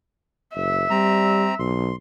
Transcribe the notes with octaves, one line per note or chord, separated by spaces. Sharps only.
F#1 E5
G3 C4 A#5
B1 C6